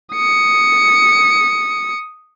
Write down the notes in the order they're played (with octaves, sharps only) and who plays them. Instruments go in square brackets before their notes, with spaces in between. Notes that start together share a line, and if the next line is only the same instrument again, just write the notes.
[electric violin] D#6 C#7